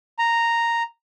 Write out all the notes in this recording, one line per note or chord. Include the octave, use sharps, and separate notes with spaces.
A#5